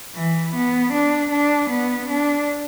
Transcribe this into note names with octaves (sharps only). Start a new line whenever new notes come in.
E3
B3
D4
D4
B3
D4